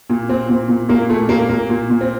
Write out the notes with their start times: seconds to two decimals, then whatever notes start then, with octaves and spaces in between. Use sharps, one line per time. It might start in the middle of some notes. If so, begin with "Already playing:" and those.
0.10 A#2
0.29 A#2 C4
0.49 A#2
0.69 A#2
0.89 A#2 A#3
1.09 A#2 A3
1.29 A#2 A#3
1.49 A#2 A#3
1.70 A#2
1.90 A#2
2.01 C4